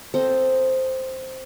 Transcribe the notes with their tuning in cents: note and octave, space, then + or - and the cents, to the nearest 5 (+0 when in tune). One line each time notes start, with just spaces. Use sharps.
C4 +0 A4 +0 D#5 +0